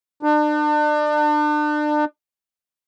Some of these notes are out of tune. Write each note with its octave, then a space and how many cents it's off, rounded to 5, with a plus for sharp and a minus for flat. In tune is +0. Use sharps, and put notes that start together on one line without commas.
D4 +35